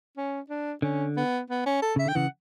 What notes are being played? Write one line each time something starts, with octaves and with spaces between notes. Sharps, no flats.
C#4
D4
D3 C#4
B3
B3
C#4
A4
C#3 E5
D3 G5
C#3 E3 F#5